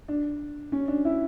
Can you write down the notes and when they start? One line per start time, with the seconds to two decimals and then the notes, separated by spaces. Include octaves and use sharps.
0.08 D4
0.72 C#4
0.88 D4
1.05 E4